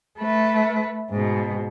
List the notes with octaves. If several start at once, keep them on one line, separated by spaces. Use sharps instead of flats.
A3 B4
G#2 B2